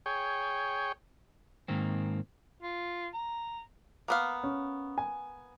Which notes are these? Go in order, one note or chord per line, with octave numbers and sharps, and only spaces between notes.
G#4 C#5 G5
G#2 D#3 A#3 C4
F4
A#5
A#3 B3 F5
C#4
G#5